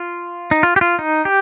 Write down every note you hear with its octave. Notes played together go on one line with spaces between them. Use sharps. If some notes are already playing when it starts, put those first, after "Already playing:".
Already playing: F4
D#4
F4
G4
F4
D#4
G4